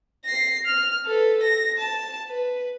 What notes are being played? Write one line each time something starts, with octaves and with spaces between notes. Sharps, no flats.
A#6 C7
F6
A4 B4
A#6
A5
B4